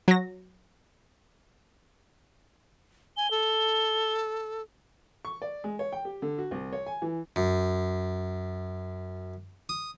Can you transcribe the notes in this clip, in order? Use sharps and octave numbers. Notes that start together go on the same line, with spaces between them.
F#3 A#6
G#5 G7
A4
C#6
D5
G#3
C#5
G5
G4
D3
F#4
C2
C#5
G#5
E3
F#2
D#6